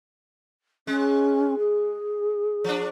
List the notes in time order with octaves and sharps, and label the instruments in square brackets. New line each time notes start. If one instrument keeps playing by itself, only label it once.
[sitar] G#3 [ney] C#4
[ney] G#4
[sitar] F3 D4